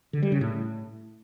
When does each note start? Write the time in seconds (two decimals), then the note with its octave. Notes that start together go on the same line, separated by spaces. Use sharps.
0.13 D3
0.23 G3
0.32 C#3
0.41 A2